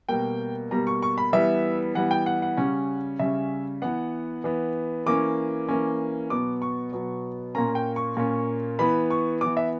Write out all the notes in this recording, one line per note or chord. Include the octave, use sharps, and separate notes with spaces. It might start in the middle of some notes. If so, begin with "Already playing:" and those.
B2 G3 A#3 G5
B2 G3 A#3 A#5
C#6
C#6
B5
E3 G3 B3 E5
E3 G3 B3 F#5
G5
F#5
F#5
C#3 G3 C#4
C#3 G3 C#4 E5
E3 B3 F#5
E3 B3
E3 A#3 C#4 D6
E3 A#3 C#4
B2 F#3 B3 D6
C#6
B2 F#3 B3
A#2 A#3 C#4 A#5
G5
C#6
A#2 A#3 C#4
E3 B3 B5
C#6
E3 B3 D6
E5